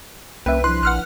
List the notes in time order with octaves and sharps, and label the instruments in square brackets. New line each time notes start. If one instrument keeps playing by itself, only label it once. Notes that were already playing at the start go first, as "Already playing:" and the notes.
[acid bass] C2 [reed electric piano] A#3 C#4 [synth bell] B4 [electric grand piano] E5 G5
[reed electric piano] F3 D4 E4 [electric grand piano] C6 [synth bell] F#6
[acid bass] A#1 [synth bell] F#5 F6 F#6